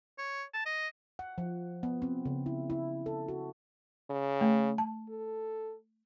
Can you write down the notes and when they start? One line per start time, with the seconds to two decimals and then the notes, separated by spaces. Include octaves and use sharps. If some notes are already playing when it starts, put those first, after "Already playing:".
0.18 C#5
0.54 A5
0.66 D#5
1.19 F#5
1.38 F3
1.83 B3
2.02 C4
2.25 C#3
2.46 E4
2.70 E4
3.06 A4
3.28 F#4
4.10 C#3
4.41 A3
4.78 A5
5.09 A4